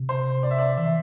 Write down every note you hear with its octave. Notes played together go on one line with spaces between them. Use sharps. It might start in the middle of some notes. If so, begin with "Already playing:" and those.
Already playing: C3
C5
D5
E5
D5
E3 E5